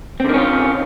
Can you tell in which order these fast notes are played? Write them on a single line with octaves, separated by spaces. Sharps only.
C4 D3 D#3 C#4 F4